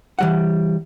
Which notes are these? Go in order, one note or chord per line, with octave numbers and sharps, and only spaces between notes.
E3 G3 F#5